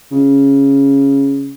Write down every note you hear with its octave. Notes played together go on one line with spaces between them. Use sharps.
C#3